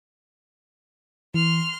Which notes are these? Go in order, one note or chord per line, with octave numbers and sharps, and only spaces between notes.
E3 C6 F6